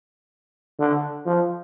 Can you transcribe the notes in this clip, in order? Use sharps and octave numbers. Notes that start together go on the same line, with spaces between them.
D3
F3